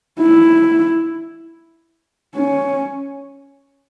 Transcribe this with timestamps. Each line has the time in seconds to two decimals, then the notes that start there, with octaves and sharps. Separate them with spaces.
0.20 E4
2.35 C#4